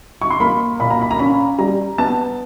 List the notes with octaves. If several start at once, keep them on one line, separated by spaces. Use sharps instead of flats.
C#6
C6
A#3 B5
A#2 B5
A#5
B5
A#5
C#4 B5
G3 A#5
B3 A5